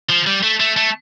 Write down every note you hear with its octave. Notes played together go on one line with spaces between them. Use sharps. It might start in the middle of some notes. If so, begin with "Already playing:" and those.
F3
G3
A3
A3
A3